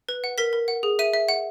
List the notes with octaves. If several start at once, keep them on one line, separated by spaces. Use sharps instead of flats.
B4
F#5
A#4 B6
A#4
F#5
G#4
E5 D#7
E5
F#5